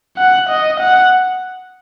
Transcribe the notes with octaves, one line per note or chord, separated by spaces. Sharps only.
F#5
D#5
F#5